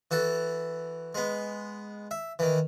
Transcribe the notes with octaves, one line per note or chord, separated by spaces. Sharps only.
E3 F#4 A4
G#3 B3
E5
D#3 E3